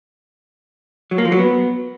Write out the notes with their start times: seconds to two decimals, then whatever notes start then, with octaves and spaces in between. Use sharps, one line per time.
1.11 F#3
1.18 A#3
1.25 F3
1.32 F#3
1.39 B3